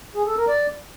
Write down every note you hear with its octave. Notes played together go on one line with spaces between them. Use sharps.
G#4
A4
A#4
D5